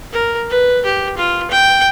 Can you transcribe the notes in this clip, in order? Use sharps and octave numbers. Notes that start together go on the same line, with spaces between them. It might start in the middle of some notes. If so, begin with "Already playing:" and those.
A#4
B4
G4
F4
G5